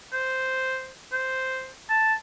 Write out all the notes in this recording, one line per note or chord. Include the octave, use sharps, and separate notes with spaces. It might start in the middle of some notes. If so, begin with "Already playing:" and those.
C5
C5
A5